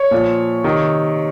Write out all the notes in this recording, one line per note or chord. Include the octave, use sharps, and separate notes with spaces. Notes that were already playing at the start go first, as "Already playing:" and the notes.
Already playing: C#5
A#2 F3
C3 D#3